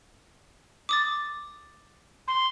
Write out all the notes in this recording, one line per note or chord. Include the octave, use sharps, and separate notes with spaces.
D6 D#6 A6
C6